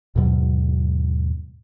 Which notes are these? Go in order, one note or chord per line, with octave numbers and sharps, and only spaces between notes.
D#2 G#2 B2 F#3